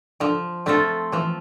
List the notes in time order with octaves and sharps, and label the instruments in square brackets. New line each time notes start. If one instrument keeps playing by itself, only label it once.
[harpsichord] D3 [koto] F3
[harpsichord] D3 [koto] A3 C4 F4 A4
[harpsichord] E3 [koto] F3